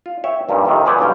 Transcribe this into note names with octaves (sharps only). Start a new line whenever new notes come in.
F4
C#5 E5 G5
G2 A#2 D#3 G3
F2 C3 D#3
G#3 C4 G#4 B4 C5 D5
B1 D3 G3 C#4 F4 G5